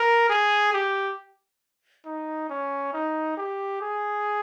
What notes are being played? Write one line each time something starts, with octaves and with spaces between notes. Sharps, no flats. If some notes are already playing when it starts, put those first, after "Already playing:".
Already playing: A#4
G#4
G4
D#4
C#4
D#4
G4
G#4